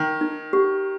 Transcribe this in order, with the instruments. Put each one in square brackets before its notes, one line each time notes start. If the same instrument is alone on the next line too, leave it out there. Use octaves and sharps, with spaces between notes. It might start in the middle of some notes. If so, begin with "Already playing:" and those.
Already playing: [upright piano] D#3
[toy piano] D#4
G4